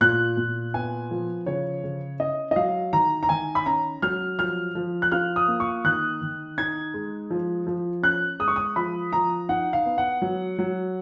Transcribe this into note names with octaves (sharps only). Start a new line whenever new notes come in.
A#2 F#6
A#2
B3 G#5
F3
C#3 C#5
C#3
C#4 D#5
D#5
F#3 F5
D#3 A#5
A#5
D#3 G#5
B5
C#4 A#5
F#3 F6
F3 F6
F3
F#6
F4 F6
D#6
A#3
C#6
D#3 F#6
D#3
D#4 G#6
G#3
F3
F3
C#4 F#6
G#3 D#6
C#6
D#6
F3 B5
F3 A#5
D#4 F#5
F5
B3
F#5
F#3
F#3